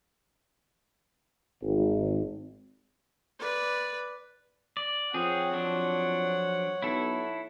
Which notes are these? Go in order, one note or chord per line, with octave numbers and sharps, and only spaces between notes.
G#1
B4 D5
D5
F2 C4 G#4 C#5 F#5
F3 F#3 D4
B1 E4 A4